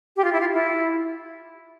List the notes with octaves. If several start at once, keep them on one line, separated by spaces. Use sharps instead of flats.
G4
F4
E4
F4
E4